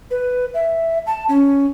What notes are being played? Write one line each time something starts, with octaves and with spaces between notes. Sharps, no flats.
B4
E5
A5
C#4